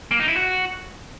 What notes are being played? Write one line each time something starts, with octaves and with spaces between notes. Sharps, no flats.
A#3
D#4
E4
F#4